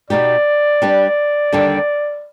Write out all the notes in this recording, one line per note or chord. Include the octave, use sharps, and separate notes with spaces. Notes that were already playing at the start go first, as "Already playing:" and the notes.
B2 B3 D#4 G4 D5
G3 D4 G4 B4
D#2 D3 G3 D4 G4